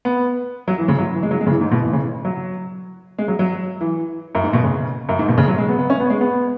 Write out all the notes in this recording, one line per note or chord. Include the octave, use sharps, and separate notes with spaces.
B3
F#3
E3
C#3
F#3
E3
G#3
F#3
G#3
C#3
E3
G#2
B2
E3
C#3
F#3
G#3
F#3
F#3
E3
F#2
G#2
B2
C#3
F#2
G#2
B2
C#3
F#3
G#3
B3
B3
C#4
B3
G#3
B3